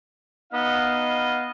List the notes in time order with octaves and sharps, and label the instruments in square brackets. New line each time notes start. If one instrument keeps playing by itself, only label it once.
[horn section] B3 D#4 D#5 F5